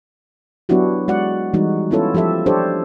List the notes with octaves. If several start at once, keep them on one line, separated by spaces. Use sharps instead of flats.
F#3 B3 D4 E4 F#4 G4
G#3 F#4 D5 F#5
E3 G3 G#3 D#4 F#4
B3 C#4 E4 F4 A4 C#5
F3 G4 A4 E5
D4 G4 A4 C5 C#5